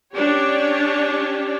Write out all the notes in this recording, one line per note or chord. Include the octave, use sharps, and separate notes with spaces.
C#4 D4 G4 C#5